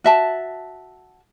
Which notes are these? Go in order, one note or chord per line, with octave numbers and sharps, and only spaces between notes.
F#4 E5 A5